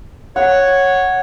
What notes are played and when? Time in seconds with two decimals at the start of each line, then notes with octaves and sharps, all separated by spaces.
0.36 C#5 F#5